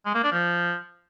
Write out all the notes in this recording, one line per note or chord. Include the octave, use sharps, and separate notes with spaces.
G#3
A#3
D4
F3